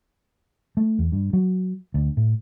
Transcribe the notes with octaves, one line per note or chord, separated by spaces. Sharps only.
A3
E2
G2
F#3
D2
A2